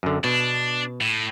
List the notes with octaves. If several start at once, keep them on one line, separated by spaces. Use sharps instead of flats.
F#2 D3
B2 D4
A2